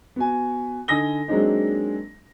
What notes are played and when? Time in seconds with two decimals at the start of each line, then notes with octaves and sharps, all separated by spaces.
0.16 B3 F#4 G#5
0.88 D3 D#4 G#5 D#6 A#6 G7
1.28 F#3 G#3 A#3 C4 D4 D#4